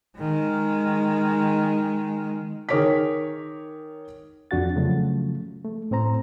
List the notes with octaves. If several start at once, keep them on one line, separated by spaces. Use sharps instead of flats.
D#3 G#3
D#3 G#4 A#4 C#5 D6 B6
F2 D4 F#4 F#5 A6
C#3 F3 F#3 A3
A3
A2 C4 C5 A#5